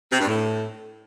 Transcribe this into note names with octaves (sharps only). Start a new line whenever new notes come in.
C3
G2
A2